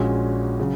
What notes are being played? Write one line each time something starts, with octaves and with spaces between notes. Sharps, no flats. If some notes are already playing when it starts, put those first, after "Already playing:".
Already playing: A#1 A#2 G#3 C#4 F#4
C#3 F#3